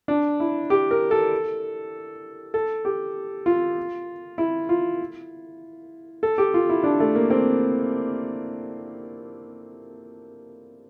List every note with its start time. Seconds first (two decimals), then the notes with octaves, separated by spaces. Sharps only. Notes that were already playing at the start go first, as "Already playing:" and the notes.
0.08 D4
0.40 E4
0.70 G4
0.91 A#4
1.11 A4
2.54 A4
2.85 G4
3.46 F4
4.38 E4
4.69 F4
6.23 A4
6.38 G4
6.54 F4
6.69 E4
6.84 D4
7.00 A3
7.15 A#3
7.30 C4